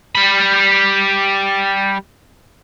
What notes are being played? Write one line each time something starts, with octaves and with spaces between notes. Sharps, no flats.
G3 B5